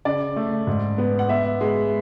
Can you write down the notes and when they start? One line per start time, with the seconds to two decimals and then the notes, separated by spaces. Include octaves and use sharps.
0.05 C#3 D5
0.36 A3
0.67 G#2
0.98 B3
1.19 F#5
1.29 B3 E5
1.61 G#3